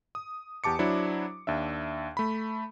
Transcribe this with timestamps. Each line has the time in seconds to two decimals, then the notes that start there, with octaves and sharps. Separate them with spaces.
0.15 D#6
0.64 E2 G4 A5 D6 C#7
0.79 F#3 D4 E4 C5
1.47 D#2 D4 E5
2.17 A3 B5